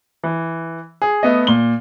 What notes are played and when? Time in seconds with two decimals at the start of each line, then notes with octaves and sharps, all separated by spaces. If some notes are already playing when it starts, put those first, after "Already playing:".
0.23 E3
1.02 G#4
1.23 A3 B3 D#5
1.47 A#2 G7